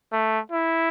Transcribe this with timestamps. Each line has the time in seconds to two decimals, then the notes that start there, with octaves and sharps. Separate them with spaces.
0.12 A3
0.52 E4